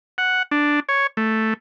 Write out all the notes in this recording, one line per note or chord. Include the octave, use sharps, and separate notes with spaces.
F#5
D4
C#5
A3